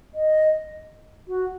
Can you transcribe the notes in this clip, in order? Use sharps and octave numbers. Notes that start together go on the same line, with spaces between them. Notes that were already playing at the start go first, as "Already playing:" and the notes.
D#5
F#4